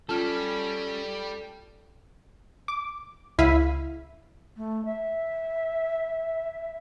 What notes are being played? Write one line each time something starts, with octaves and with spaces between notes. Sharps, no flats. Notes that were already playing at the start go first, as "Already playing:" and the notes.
G3 C#4 F4 A4 F6
D6
C#2 E4 F5 B6 D#7
A3
E5